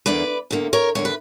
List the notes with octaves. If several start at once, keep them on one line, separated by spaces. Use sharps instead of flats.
E2 D3 A#3 B4 D5
E2 D3 A#3
A#4 C#5
E2 D3 A#3 C#5
B4